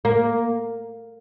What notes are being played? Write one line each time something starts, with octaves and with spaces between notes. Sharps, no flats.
A#3